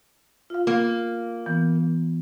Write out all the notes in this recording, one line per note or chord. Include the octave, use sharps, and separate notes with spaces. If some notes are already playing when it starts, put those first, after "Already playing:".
F4 F5
A#3
E3 B3